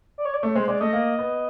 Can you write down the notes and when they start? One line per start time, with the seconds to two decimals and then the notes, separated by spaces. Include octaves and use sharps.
0.18 D5
0.25 C#5
0.34 D5
0.43 A3 C#5
0.55 G#3 C5
0.68 G#3 D5
0.80 A3 D#5
0.93 A#3
1.19 B3